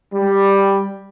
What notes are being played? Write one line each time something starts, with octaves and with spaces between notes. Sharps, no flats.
G3